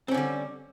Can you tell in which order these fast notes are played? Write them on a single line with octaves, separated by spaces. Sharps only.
C4 C#4 D3 G3